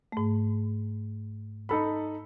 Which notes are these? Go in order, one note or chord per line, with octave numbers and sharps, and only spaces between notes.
G#2 A3
D#4 A4 B5